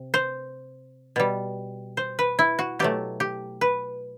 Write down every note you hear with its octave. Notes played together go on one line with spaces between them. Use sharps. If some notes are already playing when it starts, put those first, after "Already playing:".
Already playing: C3
C5
B2 G3
C5
B4
E4
F#4
B2 F#3 A3 G4
G4
B4